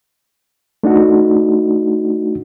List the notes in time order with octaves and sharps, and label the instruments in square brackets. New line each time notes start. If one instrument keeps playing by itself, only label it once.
[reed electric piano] A3 D4 D#4 F#4